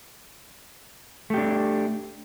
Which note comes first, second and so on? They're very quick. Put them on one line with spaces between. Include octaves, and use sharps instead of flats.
A3 G4 D4